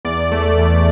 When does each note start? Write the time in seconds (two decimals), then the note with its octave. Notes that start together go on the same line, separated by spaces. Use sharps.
0.05 E2 D5
0.32 A3
0.58 E2